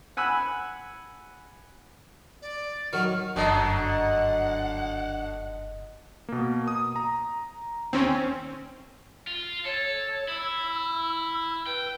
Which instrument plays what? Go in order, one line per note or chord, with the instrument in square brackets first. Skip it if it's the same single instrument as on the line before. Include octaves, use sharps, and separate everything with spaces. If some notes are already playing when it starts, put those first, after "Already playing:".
[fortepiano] F#5 G#5 B5 E6 F#6
[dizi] D5
[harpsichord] D#3 F#3 [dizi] F6
[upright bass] F#1 G2 [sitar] D3 F#3 [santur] D#5 A5 D#6 [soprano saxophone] F#5
[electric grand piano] B2 A#3
D#6
A#5
[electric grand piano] D#2 [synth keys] C4 C#4
[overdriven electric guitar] F4
[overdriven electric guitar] A4 [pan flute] C#5
[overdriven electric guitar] E4 [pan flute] E6
[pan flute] B4 [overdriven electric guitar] G5